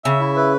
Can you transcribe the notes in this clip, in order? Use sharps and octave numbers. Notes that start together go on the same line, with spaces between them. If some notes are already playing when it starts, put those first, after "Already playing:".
C#3 E5
E4
B4